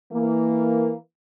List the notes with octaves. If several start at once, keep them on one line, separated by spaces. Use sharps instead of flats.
E3 A#3